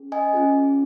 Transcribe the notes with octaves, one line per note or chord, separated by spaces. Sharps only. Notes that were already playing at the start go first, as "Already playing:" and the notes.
Already playing: C#4 G#4
D#5 G#5
C#4 F4 G#4